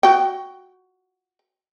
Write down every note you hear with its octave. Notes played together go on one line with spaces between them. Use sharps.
F#4 G5